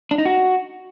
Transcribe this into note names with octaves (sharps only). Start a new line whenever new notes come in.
D4
D#4
F#4